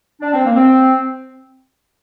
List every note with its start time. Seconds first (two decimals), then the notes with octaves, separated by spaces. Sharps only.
0.21 D4
0.32 C4
0.44 A#3
0.55 C4